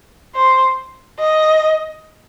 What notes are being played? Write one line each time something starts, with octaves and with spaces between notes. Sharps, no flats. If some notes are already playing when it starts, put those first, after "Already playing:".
C5
D#5